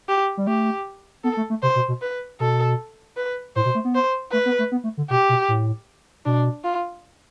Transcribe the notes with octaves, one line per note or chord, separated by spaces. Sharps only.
G4
G3
A3 G4
B3 A4
A3
A3
C3 C5
B2
B2
B4
B2 A4
B4
A2 C5
B2
A3
B3
C5
A3 B4
B3
A3
B3
A3
D3
B2 G4
B2
A2
B2 D4
F4